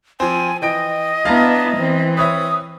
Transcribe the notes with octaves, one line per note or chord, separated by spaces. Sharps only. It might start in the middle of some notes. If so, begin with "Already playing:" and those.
F3 C4 G#5
E3 D#5 G5 D7
B3 D4 E4 F5 A5 A#5
E3 C4
B4 C#5 E5 D#6